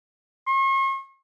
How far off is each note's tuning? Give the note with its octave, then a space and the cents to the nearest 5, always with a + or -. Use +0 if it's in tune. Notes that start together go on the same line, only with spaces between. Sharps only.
C#6 -45